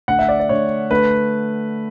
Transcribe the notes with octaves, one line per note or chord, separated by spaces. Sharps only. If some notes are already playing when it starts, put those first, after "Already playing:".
D3 A3 F#5
E5
D5
D5
D3 A3 C#5
D3 A3 B4